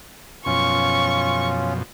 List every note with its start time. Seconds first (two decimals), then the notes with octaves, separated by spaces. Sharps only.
0.46 F#2 B2 F3 C#4 F4 C#6